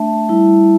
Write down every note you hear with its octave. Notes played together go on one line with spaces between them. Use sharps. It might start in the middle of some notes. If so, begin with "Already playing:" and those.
Already playing: A3 D4 E5 A5
G3 E4